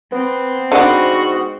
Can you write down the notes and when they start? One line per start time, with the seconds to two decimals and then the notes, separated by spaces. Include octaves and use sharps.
0.12 B3 C4
0.72 G#2 D3 B3 F#4